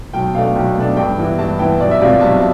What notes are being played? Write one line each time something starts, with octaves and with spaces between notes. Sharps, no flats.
B1 G5
B2 A3 D4 F5
B1 G5
B2 A3 D4 A5
G2 G5
E3 B3 E4
G2 A5
E3 B3 E4 G5
B1 D5
E5
B2 G3 C4 F4 D5
B1 A5